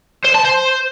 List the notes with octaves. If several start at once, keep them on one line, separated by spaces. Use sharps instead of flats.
C5
A5
C5